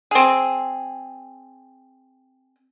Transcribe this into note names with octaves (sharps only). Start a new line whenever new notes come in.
C4 G#4